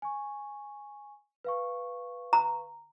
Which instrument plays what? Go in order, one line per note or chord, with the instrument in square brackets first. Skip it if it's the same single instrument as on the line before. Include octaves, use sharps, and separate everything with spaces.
[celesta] G#5 C#6
B4 F5 C#6
[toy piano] A#5